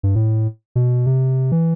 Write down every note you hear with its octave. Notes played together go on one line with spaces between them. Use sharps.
G2
A2
B2
C3
E3